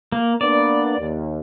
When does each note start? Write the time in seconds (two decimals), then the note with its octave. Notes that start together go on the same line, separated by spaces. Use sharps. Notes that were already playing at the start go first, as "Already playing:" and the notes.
0.12 A#3
0.41 A#3 B3 D4 D5
0.99 D#2